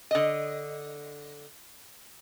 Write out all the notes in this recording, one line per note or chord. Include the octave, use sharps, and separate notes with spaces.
D3 D#5